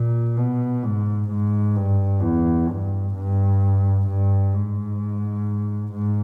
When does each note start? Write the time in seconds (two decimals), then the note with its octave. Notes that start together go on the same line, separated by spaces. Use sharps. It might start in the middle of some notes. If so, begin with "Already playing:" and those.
Already playing: A#2
0.37 B2
0.83 G#2
1.30 G#2
1.76 G2
2.22 E2
2.69 G2
3.15 G2
4.07 G2
4.53 G#2
5.92 G#2